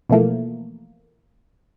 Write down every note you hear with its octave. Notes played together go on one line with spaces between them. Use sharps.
B2 E3 F3 A3 A#3